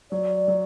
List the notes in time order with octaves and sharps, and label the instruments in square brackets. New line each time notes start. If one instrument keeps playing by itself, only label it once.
[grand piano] F#3 [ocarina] D5
[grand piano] F#3